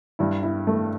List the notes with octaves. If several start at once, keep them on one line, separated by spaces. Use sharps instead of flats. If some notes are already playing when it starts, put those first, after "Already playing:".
G2 G3 E4
E4
A3